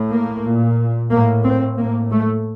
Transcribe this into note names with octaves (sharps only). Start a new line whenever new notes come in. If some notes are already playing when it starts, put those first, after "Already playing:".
Already playing: A2
A#3
A#2
A2 A#3
C4
A2 A#3
A3